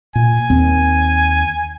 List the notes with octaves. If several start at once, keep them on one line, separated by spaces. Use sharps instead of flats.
A#2 G#5
D#2 C4